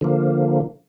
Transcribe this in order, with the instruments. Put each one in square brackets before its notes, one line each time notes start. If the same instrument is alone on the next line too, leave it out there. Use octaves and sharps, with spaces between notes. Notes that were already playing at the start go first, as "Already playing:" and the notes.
[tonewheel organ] D3 F3 A#3